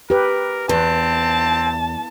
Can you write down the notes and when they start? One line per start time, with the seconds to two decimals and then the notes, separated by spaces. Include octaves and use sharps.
0.10 G4 A#4 B4
0.69 E2 C4 B4 A5